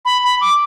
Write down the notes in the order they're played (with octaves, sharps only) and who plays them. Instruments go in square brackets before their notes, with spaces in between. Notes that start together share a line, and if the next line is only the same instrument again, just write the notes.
[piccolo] B5
B5
D6